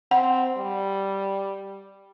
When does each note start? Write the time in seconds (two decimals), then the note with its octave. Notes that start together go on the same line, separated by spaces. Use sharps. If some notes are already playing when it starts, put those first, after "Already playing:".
0.11 C4 F#5
0.58 G3